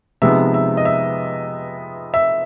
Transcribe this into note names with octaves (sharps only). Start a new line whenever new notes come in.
C3 F3 G#3 B3 D#4 E5
E5
D#5
E5
E5